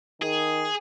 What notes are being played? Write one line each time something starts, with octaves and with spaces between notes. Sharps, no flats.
D#3 G#4